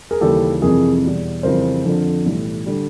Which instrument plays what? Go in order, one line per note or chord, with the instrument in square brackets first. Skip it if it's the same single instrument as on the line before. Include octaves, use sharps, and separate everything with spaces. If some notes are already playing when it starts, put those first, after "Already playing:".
[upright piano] G#4 A#4
D#2 C#3 E3 G3 G4 A4
F2 C3 E3 G3 G#4 A#4
E2 B2 G3
F2 C#3 E3 G3 A#4 C5
F2 D3 F3
B1 A2 E3 G3
D3 G3